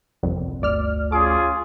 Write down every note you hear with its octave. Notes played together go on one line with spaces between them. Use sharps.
G1 C2 F2
G1 D2 D5 F6
C#4 F4 G#4 D6